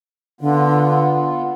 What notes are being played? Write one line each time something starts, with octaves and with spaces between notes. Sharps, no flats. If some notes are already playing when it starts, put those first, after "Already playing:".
D3 B3 F4